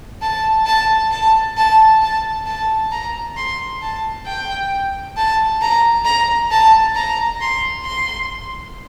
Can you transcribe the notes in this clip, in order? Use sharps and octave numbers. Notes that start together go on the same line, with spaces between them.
A5
A5
A5
A5
A5
A5
A#5
C6
A5
G5
A5
A#5
A#5
A5
A#5
C6
C6